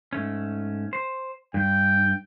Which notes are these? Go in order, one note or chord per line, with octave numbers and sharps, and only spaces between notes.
G#2 A3 C#4
C5
G2 G5